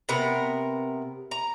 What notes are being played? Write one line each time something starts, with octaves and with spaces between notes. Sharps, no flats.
C3 B3 A#4
A#5